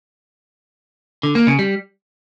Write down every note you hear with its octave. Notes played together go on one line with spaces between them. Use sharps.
D3
A#3
C#3
G3